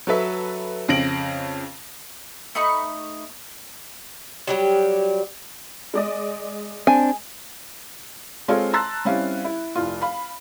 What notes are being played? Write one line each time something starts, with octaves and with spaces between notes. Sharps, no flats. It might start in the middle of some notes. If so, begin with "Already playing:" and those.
F#3 A4 B4 E5
F2 C#3 A#6 D7 F#7
A3 D#4 B5 C#6
F#3 G3 G4
G#3 D5 D#5
C4 D4 G#5
G#3 C4 F4 A4 C#5 F5
A5 A#5 C6 E6 F#6 A6
G3 C4 C#4 E4 F5
E4
F1 C2 F4
F5 B5